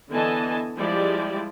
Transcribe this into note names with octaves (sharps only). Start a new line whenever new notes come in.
D3 E3 B3 D#5 G#5 A5
F3 G3 G#3 E4 G4 D5